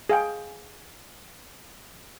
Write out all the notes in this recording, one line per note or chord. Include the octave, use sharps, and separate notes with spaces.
G#4 F5 G5